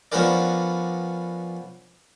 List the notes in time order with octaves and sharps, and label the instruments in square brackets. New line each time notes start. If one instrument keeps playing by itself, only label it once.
[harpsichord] F3 B3 C#4 D4 A#4 D5